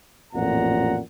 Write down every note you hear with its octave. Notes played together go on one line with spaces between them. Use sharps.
A1 F2 A#2 F#5 A#5